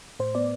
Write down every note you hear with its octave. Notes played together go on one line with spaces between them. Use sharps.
A2 C5
B3 D5